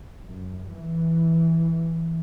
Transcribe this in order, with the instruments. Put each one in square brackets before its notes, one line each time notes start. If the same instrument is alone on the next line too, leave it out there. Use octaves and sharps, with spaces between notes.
[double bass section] F#2
E3